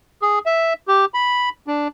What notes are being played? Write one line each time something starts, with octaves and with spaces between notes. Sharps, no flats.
G#4
E5
G4
B5
D4